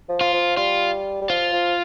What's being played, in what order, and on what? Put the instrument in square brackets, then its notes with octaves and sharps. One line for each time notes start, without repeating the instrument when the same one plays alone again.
[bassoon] F3
[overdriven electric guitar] F4
[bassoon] F3
[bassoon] G3 [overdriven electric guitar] F4
[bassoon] G3
[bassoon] F3 [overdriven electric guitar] F4
[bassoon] F3